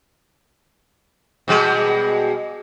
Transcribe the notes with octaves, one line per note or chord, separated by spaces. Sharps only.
B2 G3 G#3